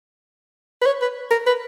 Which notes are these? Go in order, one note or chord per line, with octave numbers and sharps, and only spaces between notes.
B4
C#5
B4
A#4
B4